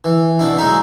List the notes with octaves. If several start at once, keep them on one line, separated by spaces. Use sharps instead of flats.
E3
B2 D4 E4
F#3 G#3 D#4 E5